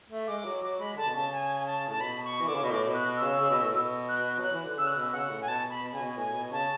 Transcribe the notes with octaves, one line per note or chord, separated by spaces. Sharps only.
A3
G#3 D6
F#3
F#3 D6
G#3 B5
D3 A5
B2
C#3 A5
G#5
G#5
A5
A2 A5
B2 B5
C#6
E3
D3 D6
C#3
B2
A2 D6
B2
F#6
B2
E6
C#3
C#3
B2
A2
B2
F#6
F#3 F#6
E3
D3
C#3 E6
F#6
B2 E6
C#3 F#5
A2
G#5
B2 A5
B2
B5
B2
C#3 G#5
B2
A2 G#5
B2
C#3 A5